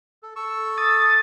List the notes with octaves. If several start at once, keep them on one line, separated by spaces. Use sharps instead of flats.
A4
A4 C#6 E6
D#6 A6